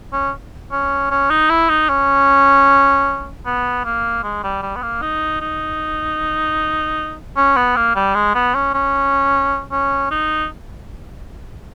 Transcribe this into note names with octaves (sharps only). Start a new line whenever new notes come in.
C#4
C#4
C#4
D#4
E4
D#4
C#4
B3
A#3
G#3
G3
G3
B3
A#3
D#4
D#4
C#4
B3
A#3
G3
G#3
B3
C#4
C#4
C#4
D#4